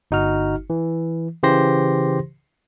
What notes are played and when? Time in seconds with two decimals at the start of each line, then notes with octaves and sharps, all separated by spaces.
0.11 G1 D#4 F#4 F6
0.70 E3
1.43 C#3 E3 G4 C5 C6 A#6